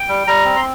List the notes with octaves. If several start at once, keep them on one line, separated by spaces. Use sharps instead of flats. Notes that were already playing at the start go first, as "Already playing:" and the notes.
Already playing: G5
G3
G3 A#5
C4
C6